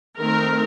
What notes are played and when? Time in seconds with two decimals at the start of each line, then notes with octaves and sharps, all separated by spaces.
0.17 D#3 A3 C4 A#4